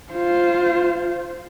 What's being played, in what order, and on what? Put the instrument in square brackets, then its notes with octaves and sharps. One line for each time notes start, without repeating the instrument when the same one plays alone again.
[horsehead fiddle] F4 C5